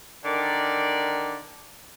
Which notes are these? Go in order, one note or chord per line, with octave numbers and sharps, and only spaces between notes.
D3 D#3 A#4 D5